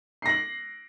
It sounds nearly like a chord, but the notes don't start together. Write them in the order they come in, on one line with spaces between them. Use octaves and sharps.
C7 A#6 F#7